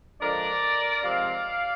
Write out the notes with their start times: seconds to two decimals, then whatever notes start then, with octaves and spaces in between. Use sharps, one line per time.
0.21 D3 F3 G#3 D4 A#4 D5
1.04 C3 F3 G#3 C4 D5 F5